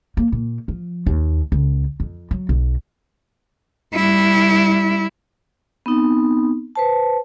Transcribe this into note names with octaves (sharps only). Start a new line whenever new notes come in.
A#3
A#2
F3
D#2
C#2
F2
F#3
B1
G3 E4
B3 C4 D#4
B4 C5 A5